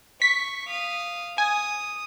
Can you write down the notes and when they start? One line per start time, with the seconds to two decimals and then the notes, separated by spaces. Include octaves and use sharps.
0.22 C#6 B6
0.68 F5 D#6
1.38 G#5 D#6